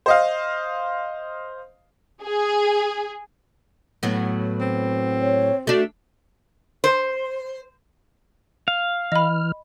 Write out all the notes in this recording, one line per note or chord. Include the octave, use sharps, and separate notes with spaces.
C5 D#5 F5
G#4
A2 F#3 B3
C4
C#5
A3 D4 F#4
C5
F5
E3 D#5 B5 F6